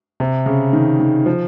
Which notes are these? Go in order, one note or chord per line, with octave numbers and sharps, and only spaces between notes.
C3
C#3
D#3
D#3
F3